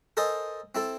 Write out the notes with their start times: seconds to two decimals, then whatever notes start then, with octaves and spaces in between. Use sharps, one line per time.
0.17 A4 A#4 C5 D#5 G#5
0.75 C4 E4 A4